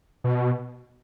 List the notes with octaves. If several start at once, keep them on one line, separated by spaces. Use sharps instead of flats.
B2